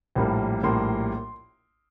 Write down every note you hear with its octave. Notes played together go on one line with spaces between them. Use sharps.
A#1 A2 G3 A#3
A#1 A2 G3 A#3 C6